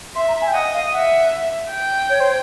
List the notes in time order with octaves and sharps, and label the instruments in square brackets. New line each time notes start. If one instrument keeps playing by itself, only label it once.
[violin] E5 [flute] C6
[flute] A#5
G#5
G5
[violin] D#5 [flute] F#5
[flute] F5
[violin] E5 [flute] F#5
[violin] G5
[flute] C#5
C5